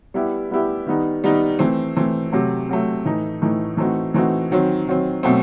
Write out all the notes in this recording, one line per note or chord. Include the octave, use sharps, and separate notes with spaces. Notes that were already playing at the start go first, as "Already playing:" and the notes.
G3 B3 E4 G4
G3 B3 E4 G4
D#3 G3 B3 D#4
D#3 G3 B3 D#4
E3 A3 C4
E3 A3 C4
C3 F#3 A3
C3 F#3 A3
A2 E3 A3 D#4
A2 E3 A3 D#4
E3 A3 C4 D#4 F#4
E3 A3 C4 D#4 F#4
D#3 F#3 C4
D#3 F#3 C4
B2 F#3 A3 C4